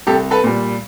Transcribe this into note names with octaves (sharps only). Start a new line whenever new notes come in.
C2 G4 A4
A4 B4
A#2 G3